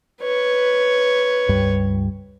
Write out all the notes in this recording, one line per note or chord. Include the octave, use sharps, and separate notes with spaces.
B4 C#5
C#2 G2 G3